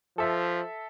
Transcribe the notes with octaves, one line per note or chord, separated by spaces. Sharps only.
F3 A4 E5